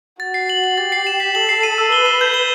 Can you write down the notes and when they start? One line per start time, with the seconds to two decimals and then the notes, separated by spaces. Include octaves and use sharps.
0.20 F#4 A6
0.34 C7
0.49 F#7
0.64 F#7
0.78 G4 A6
0.92 C7
1.07 E7
1.20 B6
1.35 A4 F#7
1.49 C7
1.63 D#7
1.78 E6
1.92 B4 G7
2.06 E7
2.21 G6
2.34 G7